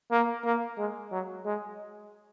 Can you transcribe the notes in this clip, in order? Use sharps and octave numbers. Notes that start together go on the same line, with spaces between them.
A#3
A#3
G#3
F#3
G#3